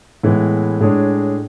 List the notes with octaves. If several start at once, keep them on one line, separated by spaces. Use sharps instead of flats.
A2 E3 G#3 B3
A2 G#3 D4 G#4 C#5